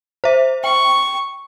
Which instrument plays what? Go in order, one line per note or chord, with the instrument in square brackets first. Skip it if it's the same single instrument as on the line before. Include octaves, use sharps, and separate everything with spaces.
[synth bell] C5 E5
[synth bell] G5 [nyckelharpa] C#6